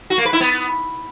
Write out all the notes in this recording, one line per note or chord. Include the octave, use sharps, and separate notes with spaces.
F#4
A#3
B4
E4
B3